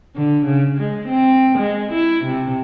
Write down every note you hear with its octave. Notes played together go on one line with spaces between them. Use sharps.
D3
C#3
G#3
C4
G#3
E4
C3